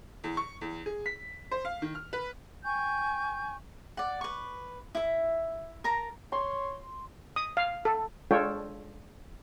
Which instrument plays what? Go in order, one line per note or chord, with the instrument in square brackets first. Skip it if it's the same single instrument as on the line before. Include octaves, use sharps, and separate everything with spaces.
[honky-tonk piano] E2
C#6
E2
G#4
B6
C5
F5
D#3
F6
B4
[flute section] G5 G#5 C#6 G6
[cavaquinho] D5 F#5
B4 C#6
E4 E5
A#4 A5 A#5
[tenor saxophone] C#5 [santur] C6
[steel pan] D#6
F5
A4
G#3 D4 F4 A4 C#5 G5